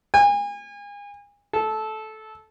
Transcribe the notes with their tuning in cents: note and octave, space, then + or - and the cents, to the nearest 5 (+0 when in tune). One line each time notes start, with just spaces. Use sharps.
G#5 -35
A4 -15